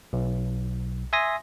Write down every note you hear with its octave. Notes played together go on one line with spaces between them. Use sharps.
B1
E5 G#5 C6 D#6 A#6